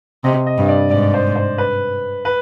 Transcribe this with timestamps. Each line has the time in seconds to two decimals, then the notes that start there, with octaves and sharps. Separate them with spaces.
0.24 C3 D#5
0.47 D#5
0.58 G2
0.69 D5
0.91 G#2 D5
1.14 C5
1.36 C5
1.58 B4
2.25 B4